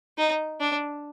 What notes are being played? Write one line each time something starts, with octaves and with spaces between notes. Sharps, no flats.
D#4
D4